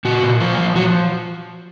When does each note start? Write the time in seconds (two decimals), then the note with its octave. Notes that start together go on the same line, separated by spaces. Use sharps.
0.05 A#2 F#4
0.23 A#2
0.40 F3 F4
0.58 F3
0.75 F3 F#4